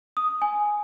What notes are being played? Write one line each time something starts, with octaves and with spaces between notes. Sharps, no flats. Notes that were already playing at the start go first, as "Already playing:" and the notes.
D#6
G#5